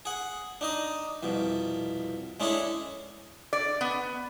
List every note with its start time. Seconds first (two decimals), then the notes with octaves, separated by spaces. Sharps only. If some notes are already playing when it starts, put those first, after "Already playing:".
0.05 G#4 F#5
0.61 D4 D#4 D#5
1.23 C2 F2 B2
2.40 G#3 C#4 D4 E4 G#4 A4
3.53 D5
3.81 B3